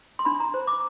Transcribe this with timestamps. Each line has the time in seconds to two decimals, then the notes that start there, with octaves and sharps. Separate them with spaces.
0.19 C6
0.25 D4 B5
0.40 A#5
0.54 C5
0.67 D6